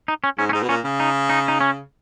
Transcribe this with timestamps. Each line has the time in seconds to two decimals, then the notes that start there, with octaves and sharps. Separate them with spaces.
0.08 D#4
0.24 C#4
0.38 G#2 C#4
0.49 C#4
0.53 G#2 D#4
0.63 B2
0.69 A#2 C#4
0.84 C#3
1.00 D#4
1.30 D#4
1.48 D#4
1.61 C#4